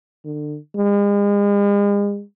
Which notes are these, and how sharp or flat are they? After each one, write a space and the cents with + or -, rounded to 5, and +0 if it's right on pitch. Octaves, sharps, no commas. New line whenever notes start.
D3 +30
G#3 -40